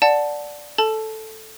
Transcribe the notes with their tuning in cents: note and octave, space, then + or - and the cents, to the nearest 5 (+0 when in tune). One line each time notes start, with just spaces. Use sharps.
D5 +0 F#5 -15 A5 -5
A4 +0 A5 -15